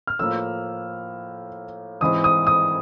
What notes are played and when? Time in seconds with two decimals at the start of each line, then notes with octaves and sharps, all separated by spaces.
0.07 F6
0.19 A2 F3 A#3 E6
2.01 G#2 E3 G#3 C4 D#6
2.24 D#6
2.47 D#6